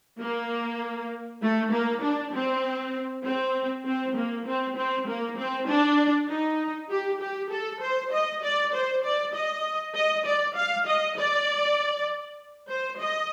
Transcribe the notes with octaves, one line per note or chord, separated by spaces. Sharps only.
A#3
A3
A#3
D4
C4
C4
C4
A#3
C4
C4
A#3
C4
D4
D#4
G4
G4
A4
C5
D#5
D5
C5
D5
D#5
D#5
D5
F5
D#5
D5
C5
D#5